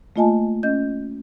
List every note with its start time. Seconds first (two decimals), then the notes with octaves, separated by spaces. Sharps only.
0.16 A3 A#3 F4 D#5 G#5 A5
0.63 C#4 D#5 G6